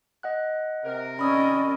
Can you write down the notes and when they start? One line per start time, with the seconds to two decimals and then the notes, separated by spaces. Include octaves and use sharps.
0.23 D#5 F#5 F#6
0.84 C3 A#4
1.19 C#4 D5 D#5 B5 D#6 E6